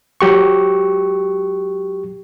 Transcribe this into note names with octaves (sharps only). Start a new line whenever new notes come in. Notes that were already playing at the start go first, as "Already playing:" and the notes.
F#3 G4 C#6